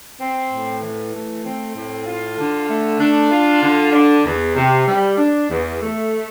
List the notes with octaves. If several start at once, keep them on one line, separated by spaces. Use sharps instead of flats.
C4
A2
E3
A3
C4
A2
F4
D3
A3
D4
F4
D3
D4
E2
C3
G3
D4
E2
A3